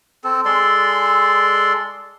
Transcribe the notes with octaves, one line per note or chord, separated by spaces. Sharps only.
C4 A4
G#3 A4 D5 C6